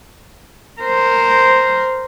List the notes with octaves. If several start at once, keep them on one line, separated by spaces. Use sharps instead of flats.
A#4 C5